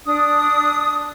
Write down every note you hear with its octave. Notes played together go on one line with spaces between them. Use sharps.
D4 D#6